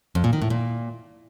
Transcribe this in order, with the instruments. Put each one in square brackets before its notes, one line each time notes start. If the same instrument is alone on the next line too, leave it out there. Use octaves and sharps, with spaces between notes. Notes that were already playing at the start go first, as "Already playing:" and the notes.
[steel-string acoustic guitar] F2
A#2
D#3
A2
A#2